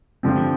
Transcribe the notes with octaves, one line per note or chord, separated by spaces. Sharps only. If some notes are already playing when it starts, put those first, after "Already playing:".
G2 D3 F3 C4